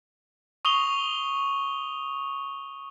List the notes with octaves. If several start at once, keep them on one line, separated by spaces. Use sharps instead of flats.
C#6 D#6 F7 G7